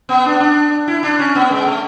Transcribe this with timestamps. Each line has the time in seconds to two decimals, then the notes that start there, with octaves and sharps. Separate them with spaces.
0.09 B3
0.25 D4
0.40 D4
0.88 E4
1.03 D4
1.19 C#4
1.35 B3
1.51 G#3
1.66 A3